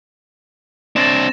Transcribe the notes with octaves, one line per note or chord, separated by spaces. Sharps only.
C4 D4 A6 A#6 E7